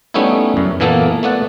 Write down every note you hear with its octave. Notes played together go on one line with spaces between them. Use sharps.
G3 A3 B3 C#4 D#4 E4
F#2
A#2 E3 A#3 B3 A4
A3 B3 D5 F#5